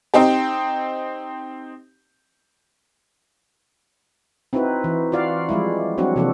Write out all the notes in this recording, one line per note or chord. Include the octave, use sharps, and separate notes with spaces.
C4 D#4 G4
C4 D#4 E4 F#4 B4
E3
F4 F#4 D5 F5
F3 G3 G#3 E4
F#3 G3 C4 D4 F#4
C3 E3 F3 A#3 G4 A4